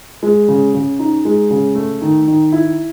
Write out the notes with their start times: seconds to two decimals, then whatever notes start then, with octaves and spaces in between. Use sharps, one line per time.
0.23 G#3
0.48 C#3
0.74 C#3
0.99 D#4
1.25 G#3
1.50 C#3
1.75 A3
2.02 D#3
2.27 D#3
2.52 E4